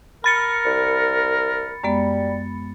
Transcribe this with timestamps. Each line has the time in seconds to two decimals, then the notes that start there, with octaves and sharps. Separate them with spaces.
0.24 A#4 B5 A6 C#7
0.66 C2
1.83 F#2 G3 G#3 B3